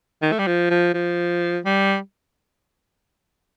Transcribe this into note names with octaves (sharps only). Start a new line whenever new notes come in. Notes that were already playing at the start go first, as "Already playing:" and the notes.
D#3
A3
G3
F3
F3
F3
G3